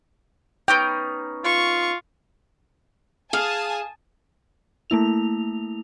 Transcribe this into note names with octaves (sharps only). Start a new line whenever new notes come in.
B3 C#4 D#4 G5
F4 C#6
G#4 F5 G#5 A5 D#6
A3 A#3 E4 F7